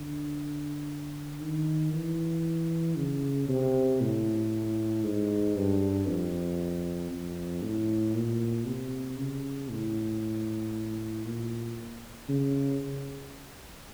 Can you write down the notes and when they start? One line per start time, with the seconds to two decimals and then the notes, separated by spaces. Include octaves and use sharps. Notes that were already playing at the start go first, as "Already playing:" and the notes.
Already playing: D3
1.42 D#3
1.93 E3
2.97 C#3
3.48 C3
4.01 A2
5.04 G#2
5.56 G2
6.07 F2
7.11 F2
7.62 A2
8.14 A#2
8.66 C3
9.18 C#3
9.70 A2
11.25 A#2
12.29 C#3